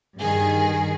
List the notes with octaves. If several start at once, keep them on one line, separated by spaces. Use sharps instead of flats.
G2 D#3 G#4